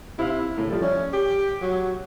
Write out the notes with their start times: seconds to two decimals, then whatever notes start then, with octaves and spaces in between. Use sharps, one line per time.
0.19 C3 E4 F5
0.58 A2 C#3
0.69 F3 G3 A4
0.82 C#4 D5 E5
1.13 G4
1.62 F#3